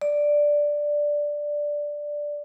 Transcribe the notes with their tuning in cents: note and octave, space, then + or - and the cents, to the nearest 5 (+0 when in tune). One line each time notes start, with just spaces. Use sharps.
D5 +0